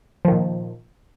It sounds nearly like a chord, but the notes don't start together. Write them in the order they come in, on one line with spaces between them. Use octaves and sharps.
F3 D#3 A#2